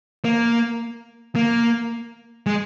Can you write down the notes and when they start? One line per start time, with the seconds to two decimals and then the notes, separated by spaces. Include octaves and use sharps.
0.25 A#3
1.35 A#3
2.46 G#3